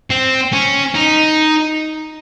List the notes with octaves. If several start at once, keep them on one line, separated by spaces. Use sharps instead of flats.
C4
C#4
D#4